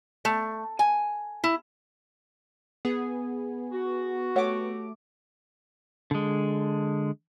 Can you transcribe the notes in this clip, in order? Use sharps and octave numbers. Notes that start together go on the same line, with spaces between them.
A3
G#5
E4
B3 G#4
F#4
A3 G4 C#5 F#5 D6
D3 G#3